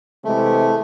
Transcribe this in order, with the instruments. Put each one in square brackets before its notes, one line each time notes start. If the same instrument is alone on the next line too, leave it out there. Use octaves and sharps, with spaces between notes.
[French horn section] C3 E3 G#3 [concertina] A3